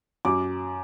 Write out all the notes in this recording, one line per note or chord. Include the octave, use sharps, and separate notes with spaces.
F#2 D6